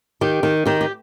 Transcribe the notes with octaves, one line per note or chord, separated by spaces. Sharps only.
D#3 G4
D#3
D#3 G4
G4